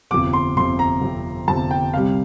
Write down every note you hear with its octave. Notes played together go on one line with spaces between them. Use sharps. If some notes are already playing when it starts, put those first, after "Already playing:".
G1 F2 C3 D6
C6
G1 F2 C3 C6
A#5
G1 F2 C3
G1 F2 C3 A5
G5
C2 C3 G3 F5